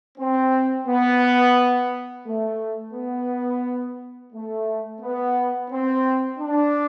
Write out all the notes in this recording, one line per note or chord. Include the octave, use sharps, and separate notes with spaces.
C4
B3
A3
B3
A3
B3
C4
D4